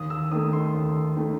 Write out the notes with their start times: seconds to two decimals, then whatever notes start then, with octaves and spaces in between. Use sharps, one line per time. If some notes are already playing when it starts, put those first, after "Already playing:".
Already playing: D#2 D#6
0.10 E6
0.32 D#3 A3 D#6
0.53 C6
0.74 D#2
1.17 D#3 A3